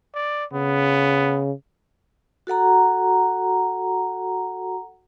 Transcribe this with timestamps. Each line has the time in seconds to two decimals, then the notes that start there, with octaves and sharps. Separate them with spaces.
0.15 D5
0.53 C#3 B3
2.47 F#4 A4 F#5 A#5